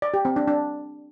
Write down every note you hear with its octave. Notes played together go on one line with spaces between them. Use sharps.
D5
G4
C4
D4
D4